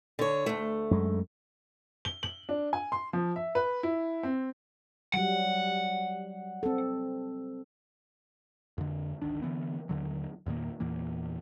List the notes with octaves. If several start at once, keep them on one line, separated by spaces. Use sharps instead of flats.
D3 C#5
D2 A3
F#2 G#3
G7
F#7
D4
G#5
C6
F3
E5
B4
E4
C4
F#3 G3 F#5
C4 A4
F2 D3
G#1 D2 D#3 D4
D3 E3 B3
D#2 D3 F#3
E2 A#2 D#3 A#3
E2 A#2 E3 A#3